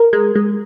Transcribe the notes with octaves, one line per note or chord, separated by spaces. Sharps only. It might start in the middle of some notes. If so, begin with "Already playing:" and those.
Already playing: A#4
G#3
G#3